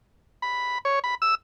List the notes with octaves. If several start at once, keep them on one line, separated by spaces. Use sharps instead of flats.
B5
C#5
B5
E6